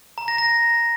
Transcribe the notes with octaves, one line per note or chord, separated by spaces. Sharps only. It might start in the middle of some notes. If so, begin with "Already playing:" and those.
A#5
A#6
A#6